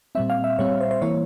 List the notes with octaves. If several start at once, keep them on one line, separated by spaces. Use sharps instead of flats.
A#2 G3 C4 E5
F5
E5
A#2 G3 C4 C#5
C5
C5
E3 A#3 E4 C#5